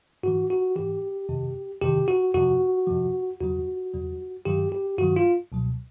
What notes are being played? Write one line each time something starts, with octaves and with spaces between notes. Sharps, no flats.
G#2 E3 F#4
F#4
G#2 E3 G4
F2 C3 D#3
F2 C3 D#3 G4
F#4
F2 C3 F3 F#4
F2 C3 F3
E2 C#3 F#3 F#4
E2 C#3 F#3
G2 D#3 F#3 G4
G4
G2 D#3 F#3 F#4
F4
C#2 B2 F#3